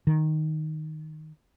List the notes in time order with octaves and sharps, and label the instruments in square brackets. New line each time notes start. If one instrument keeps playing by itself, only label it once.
[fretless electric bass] D#3